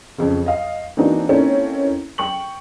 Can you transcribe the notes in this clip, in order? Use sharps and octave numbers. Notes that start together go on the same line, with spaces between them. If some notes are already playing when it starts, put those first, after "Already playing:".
F2 C#3
D#5 F5
E3 A#3 C4 D4 D#4 F#4
A#3 C4 C#4 D#4 E4 A4
G5 C#6 F#7